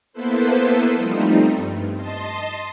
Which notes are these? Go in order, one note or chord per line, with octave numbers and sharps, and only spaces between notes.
A#3 B3 E4 A4 B4 C5
F3 G3 A3 C4 D#4
G2
D#5 A5 C6